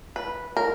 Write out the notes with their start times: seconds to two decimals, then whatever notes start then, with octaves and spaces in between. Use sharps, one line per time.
0.16 B4
0.57 A#4